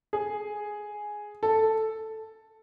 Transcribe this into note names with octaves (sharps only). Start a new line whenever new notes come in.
G#4
A4